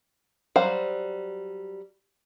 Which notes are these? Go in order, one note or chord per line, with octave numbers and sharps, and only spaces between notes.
F#3 G3 C5 F5